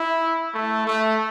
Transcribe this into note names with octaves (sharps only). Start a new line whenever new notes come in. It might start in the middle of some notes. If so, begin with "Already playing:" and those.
Already playing: E4
A3
A3